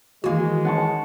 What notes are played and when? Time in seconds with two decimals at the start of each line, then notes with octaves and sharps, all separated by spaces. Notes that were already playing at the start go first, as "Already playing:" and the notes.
0.24 D#3 E3 G#3 A#3 F#4
0.65 F#5 A5 C#6